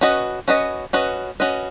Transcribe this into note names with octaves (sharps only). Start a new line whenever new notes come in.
C#4 F#4 B4 D#5
C#4 F#4 B4 D#5
C#4 F#4 B4 D#5
C#4 F#4 B4 D#5